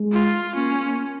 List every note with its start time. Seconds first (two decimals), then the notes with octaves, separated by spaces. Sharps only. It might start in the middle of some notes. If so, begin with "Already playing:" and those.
Already playing: G#3
0.12 F4
0.55 A#3 C#4
0.85 A#3